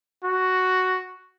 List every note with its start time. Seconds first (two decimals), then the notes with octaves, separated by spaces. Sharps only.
0.24 F#4